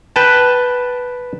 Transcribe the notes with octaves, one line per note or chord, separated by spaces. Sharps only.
B4 G5 A5